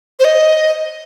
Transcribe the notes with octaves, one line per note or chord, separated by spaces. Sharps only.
C5
D#5